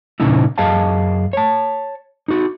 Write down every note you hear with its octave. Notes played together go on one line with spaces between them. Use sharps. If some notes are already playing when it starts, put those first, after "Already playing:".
A#2 C#3 C#4 D#4 E4
F#2 G#4 D#5 F5 A5
C#5 A5
D#4 F#4